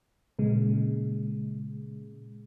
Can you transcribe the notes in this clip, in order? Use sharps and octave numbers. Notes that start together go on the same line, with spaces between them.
A#2 C#3 G#3